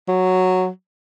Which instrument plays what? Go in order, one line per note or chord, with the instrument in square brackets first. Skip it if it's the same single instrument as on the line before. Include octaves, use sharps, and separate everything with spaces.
[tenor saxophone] F#3